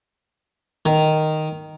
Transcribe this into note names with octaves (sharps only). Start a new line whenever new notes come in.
D#3